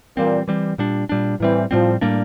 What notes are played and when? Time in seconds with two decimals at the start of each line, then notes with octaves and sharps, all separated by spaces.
0.17 A#2 E3 G3 C4
0.48 E3 G3 C4
0.78 A#2 G3 D4
1.09 A#2 G3 D4
1.40 A2 E3 G3 C4
1.71 A2 F3 G3 C4
2.01 A2 G3 A#3 D4